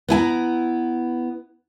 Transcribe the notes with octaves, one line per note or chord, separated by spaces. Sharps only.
B3 E4 G#5 A#5